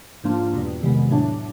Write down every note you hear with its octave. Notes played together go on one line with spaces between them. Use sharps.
G#2 F3 A#3 D4 F4
E2 B2 G3
F2 C3 D#3 G#3 B3
A2 F#3 A3 D4